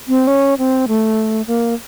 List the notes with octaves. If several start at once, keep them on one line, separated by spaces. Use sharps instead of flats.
C4
C#4
C4
A3
A#3